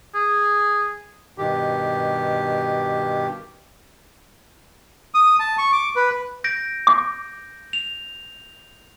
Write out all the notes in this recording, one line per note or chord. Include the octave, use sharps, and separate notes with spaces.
G#4
G2 B2 D#3 G4
D#6
A5
C#6
D6
B4
G6 A#6 D7
D6
F7